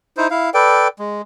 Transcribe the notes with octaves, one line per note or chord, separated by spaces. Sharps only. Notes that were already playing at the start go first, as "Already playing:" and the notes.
D#4 E4 C5
E4 F5
A4 B4 D5 G5
G#3